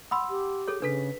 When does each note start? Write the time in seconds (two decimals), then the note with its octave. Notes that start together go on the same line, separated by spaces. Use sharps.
0.11 F#5 B5 C6 D#6 E6
0.30 G4
0.68 G#4 A4 C#5
0.82 C#3 D4 A4 B4 B6